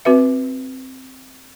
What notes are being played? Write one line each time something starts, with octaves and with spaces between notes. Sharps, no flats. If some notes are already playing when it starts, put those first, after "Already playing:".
C4 F#4 B4 E5